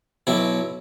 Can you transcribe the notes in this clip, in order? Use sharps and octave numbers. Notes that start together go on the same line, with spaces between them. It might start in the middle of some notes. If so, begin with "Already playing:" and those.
B1 B2 F#3 E4